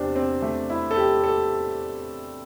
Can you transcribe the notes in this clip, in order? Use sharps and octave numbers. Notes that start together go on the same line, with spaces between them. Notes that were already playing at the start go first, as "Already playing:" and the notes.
Already playing: E2 C3 D4 G4 C5 D5
C4
A3
E4
A4
G4
A4